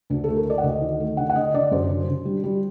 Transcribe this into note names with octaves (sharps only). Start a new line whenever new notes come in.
D2 D4
A3 A4
A#4
A3 D5
F#5
D2 D#5
D#3
A3
D3 F#5
F#5
D3 D#5
D3 D5
F#2 C5
D3
D3
G3
G3